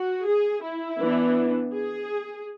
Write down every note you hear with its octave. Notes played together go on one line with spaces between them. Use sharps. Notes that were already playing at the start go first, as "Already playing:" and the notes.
Already playing: F#4
G#4
E4
E3 B3 D4
G#4